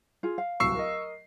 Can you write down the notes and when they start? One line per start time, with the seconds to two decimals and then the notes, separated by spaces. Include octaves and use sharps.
0.23 F4 G#4
0.38 F5
0.60 D1 C2 F#4 C#6 E6 C7
0.75 A#4 D#5